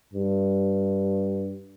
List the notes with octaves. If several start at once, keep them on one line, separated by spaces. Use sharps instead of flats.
G2